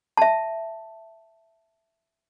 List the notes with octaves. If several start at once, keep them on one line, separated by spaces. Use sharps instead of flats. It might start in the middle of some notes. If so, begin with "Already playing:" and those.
E5 A5